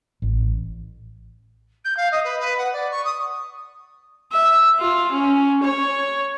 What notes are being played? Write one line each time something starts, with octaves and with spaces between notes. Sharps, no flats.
A1
G6
F5
D#5
B4
B4
F#5
D5
C#6
D#6
E5
F4
C#4
C#5